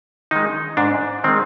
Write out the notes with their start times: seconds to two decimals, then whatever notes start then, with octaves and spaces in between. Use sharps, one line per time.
0.31 D#3 G#3 D#4
0.77 G#2 D4
1.24 D#3 G#3 C4